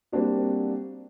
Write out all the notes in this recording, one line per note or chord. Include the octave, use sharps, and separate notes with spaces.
G3 A#3 C4 D4 F#4